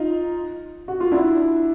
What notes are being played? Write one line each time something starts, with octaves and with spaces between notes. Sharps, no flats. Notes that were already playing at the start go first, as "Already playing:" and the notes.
Already playing: D#4 F4
F#4
F4
D4 E4